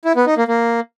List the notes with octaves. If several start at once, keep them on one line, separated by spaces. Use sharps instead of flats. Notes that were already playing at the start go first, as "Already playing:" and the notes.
E4
B3
D#4
A#3
A#3